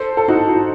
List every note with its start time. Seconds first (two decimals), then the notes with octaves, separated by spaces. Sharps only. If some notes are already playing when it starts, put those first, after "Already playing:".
Already playing: A4 C5
0.17 A4
0.28 D#4 F#4
0.49 D#4